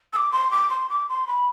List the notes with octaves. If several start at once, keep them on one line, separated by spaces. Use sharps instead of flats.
E6
D6
C6
D6
C6
D6
C6
B5